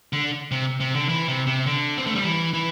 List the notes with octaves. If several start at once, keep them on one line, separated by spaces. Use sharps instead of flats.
D3
C3
C3
D3
E3
C3
C3
D3
C4
A3
G3
E3
E3